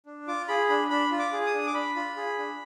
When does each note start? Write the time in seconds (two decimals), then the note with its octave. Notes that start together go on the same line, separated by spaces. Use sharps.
0.06 D4
0.27 F4 D6
0.48 G#4 B5
0.69 D4 B5
0.90 D4 B5
1.11 F4
1.19 D6
1.33 G#4
1.46 D#6
1.54 D4
1.67 D6
1.74 D4 B5
1.96 F4
2.17 G#4
2.39 D4